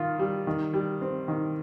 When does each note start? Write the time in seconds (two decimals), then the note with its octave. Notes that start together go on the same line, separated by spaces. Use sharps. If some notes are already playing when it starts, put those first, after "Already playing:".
Already playing: D#3 F4
0.19 G3
0.47 D#3
0.74 G3
1.01 C4
1.28 D#3